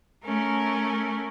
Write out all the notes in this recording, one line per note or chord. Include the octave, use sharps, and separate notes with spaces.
A3 C#4 A#4